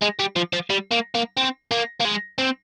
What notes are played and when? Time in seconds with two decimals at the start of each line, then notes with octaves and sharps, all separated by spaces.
0.02 G#3
0.19 G3
0.36 F3
0.53 F3
0.70 G3
0.92 A#3
1.15 A#3
1.37 C4
1.71 A#3
2.00 A#3
2.05 G#3
2.38 C4